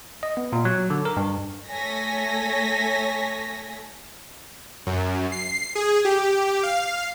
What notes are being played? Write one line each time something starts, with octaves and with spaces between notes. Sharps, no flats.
D#5
B3
A#2
F#3
D3
A#4
G2
A3 A4 C#5 G#5 A#6 B6
F#2
C7
G#4
G4
F5